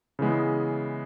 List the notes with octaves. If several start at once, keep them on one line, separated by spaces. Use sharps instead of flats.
C#3 E3 G#3 B3